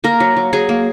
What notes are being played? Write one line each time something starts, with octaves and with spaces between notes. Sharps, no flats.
A#3 A#4
F#3
F#3
F#3 G#4
A#3